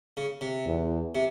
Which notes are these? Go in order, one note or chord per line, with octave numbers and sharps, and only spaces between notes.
C#3
C3
E2
C3